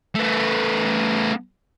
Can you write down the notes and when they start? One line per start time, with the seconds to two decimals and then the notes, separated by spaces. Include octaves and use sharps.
0.15 A3 B3